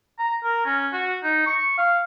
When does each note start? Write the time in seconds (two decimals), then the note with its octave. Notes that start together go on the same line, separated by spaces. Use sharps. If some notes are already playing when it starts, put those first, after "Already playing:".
0.18 A#5
0.44 A#4
0.65 C#4
0.93 F#4
1.23 D#4
1.46 C#6
1.78 F5